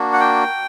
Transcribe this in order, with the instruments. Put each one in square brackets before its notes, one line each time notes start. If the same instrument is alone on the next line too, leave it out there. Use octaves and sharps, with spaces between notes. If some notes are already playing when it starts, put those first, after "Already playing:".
Already playing: [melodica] A#3 D4 F#4
F#5
G5